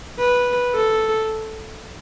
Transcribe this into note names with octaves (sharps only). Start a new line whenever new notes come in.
B4
A4